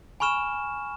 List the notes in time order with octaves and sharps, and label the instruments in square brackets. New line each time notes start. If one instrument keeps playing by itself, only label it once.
[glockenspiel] G#5 B5 C#6 F6 E7